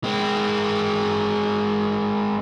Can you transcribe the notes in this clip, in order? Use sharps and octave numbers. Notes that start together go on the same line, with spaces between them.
G#3 C4